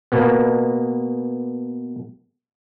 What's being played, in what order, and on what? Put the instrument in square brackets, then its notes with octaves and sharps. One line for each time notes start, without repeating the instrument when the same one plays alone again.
[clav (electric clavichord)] B2 A#3 B3